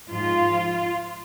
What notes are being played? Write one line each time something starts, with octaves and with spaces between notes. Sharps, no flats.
G#2 F3 F4